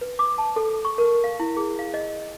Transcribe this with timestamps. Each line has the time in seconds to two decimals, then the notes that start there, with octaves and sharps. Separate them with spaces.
0.01 B4
0.19 D6
0.38 A5
0.56 A4
0.85 C#6
0.98 A#4
1.24 F5
1.40 E4
1.57 G#4
1.79 F5
1.94 D#5